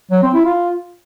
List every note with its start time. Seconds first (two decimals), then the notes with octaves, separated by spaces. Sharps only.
0.11 F#3
0.23 C4
0.34 E4
0.46 F4